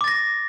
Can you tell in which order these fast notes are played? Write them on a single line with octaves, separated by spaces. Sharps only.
D6 A6 A#6